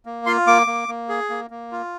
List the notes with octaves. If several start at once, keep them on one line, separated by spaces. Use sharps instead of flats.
A#3
F4 C6
A#3 D6
A#3
A#3
G#4
A#3
A#3
F4